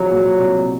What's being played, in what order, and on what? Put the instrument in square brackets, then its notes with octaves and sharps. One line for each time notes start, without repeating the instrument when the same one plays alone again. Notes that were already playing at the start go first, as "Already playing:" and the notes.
Already playing: [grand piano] C2 F3 G#3 [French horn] F#3
[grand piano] A#2
C2